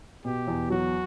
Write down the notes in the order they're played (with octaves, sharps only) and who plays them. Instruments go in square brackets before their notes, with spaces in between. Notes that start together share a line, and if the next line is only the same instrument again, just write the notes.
[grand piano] B2 [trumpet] G4
[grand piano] E2
[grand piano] F#3 [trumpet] F#4